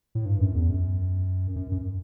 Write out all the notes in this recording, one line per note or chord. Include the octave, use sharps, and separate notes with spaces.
A2
G2
F#2
E2
F#2
F#2
F#2